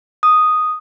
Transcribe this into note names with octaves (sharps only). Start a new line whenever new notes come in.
D#6